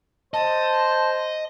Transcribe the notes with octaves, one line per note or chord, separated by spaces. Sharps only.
C5 D#5 A5